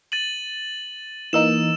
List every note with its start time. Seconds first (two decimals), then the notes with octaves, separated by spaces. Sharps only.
0.12 A6 D#7 F#7
1.33 E3 A#3 D#4 E6 E7